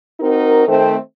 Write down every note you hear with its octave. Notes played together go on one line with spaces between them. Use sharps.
C4 D#4 F#4 A#4
D#3 A3 C4